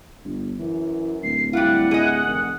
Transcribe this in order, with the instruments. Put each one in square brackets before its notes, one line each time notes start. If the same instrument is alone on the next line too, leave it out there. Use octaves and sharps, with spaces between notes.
[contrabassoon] G1
[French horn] F#2 [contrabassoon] E3
[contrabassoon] D1 [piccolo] C7
[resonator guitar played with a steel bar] G3 F4 [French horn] E4 [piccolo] F#5
[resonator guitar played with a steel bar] G#4 D#5
[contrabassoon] F1 [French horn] D#3